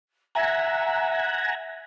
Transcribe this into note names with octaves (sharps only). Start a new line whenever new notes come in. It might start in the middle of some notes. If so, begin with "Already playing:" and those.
E5 F#5 G#5 A#5